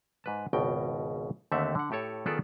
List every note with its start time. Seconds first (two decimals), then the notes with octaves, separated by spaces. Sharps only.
0.24 G#2 B4 A5
0.53 G#1 C#2 B2 G5
1.52 D#2 D3 A3 C4 E5 F#5
1.75 D3 F#5
1.91 A2 G4 A4 C#5
2.26 D#3 B3 F4 G#4 A4 D5